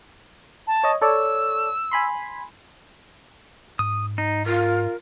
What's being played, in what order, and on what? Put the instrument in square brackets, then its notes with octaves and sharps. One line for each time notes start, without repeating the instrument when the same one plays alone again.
[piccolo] A5
[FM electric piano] C#5 D#5
[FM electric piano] A4 C#5 D5 [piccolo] E6
[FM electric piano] G#5 B5 C6
[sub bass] G#2 [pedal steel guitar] D#6
[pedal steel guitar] D#4
[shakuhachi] F4 [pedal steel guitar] A#4